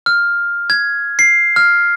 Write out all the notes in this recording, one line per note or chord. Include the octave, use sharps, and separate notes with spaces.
F6
G#6
C7
F6